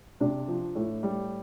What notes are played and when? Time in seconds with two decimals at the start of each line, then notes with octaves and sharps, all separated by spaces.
0.20 C3 D4
0.48 F3
0.75 A2
1.03 G3